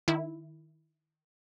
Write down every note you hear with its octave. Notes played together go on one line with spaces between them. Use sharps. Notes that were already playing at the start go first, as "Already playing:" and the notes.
D#3 E4